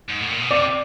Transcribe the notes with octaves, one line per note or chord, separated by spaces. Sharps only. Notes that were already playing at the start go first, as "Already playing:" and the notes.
G#2
A2
A#2
B2
C3 D5